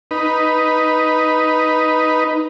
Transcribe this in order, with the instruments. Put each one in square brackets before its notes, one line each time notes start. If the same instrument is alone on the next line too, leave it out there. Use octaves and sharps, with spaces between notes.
[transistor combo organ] D#4 B4